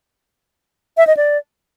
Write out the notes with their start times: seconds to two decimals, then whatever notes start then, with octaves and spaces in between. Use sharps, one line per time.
0.97 E5
1.07 D#5
1.17 D5